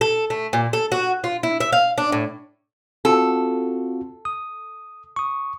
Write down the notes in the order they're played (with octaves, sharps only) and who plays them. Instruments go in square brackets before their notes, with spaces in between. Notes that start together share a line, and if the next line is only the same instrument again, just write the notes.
[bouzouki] A4
A3
A#2
A4
F#4
F4
E4
E5
F5
D4
A2
[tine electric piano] C4 F4 F#4 [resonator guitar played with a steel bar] A4
[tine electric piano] D#6
C#6 D#6